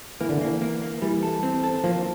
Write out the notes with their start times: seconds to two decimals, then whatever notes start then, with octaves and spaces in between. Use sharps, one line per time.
0.21 E3 A#3
0.29 D3
0.37 E3 A#3
0.62 A#3
0.82 A#3
1.02 E3 G3
1.23 A4
1.43 C4
1.64 A4
1.84 F3 A#3